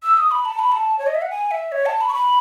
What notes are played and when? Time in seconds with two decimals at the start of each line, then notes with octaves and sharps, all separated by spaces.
0.03 E6
0.17 D#6
0.31 B5
0.45 A5
0.59 B5
0.72 A5
0.99 C#5
1.07 D#5
1.15 E5
1.22 F#5
1.30 G#5
1.51 E5
1.72 C#5
1.86 A5
2.01 B5
2.09 C#6
2.14 B5